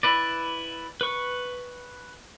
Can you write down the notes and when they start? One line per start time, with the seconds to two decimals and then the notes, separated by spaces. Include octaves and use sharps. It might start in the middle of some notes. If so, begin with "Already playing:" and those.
0.03 E4 B4 D5
1.01 B4 C#6